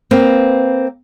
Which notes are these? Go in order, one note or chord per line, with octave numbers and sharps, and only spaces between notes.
A#3 C4 B4 F5